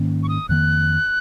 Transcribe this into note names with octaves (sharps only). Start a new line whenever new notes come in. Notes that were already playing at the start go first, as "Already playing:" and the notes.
Already playing: G#2 D#3 A#3 C#4
C#6
D#6
F2 D#3 A#3 F#6